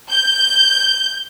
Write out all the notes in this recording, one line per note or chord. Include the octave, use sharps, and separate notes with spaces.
G6